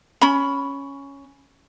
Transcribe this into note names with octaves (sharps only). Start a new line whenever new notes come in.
C#4 B5